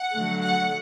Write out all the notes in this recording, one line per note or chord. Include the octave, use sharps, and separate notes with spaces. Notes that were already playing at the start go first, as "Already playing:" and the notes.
Already playing: F#5
D3 F#3 A3
F#5